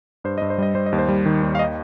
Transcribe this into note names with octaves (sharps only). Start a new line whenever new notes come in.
G2 C5
G2 D#5
C5
G3 D#5
G3 C5
D#5
D#2
C5
G3
D#3
D#2
F5
D#5